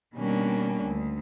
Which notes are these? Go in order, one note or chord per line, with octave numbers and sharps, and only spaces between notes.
B2 D#3 G3 A#3 C#4 D4
D2